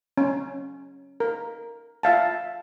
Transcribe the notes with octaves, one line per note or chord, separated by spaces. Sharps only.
C#4
A#4
F4 E5 F5 A5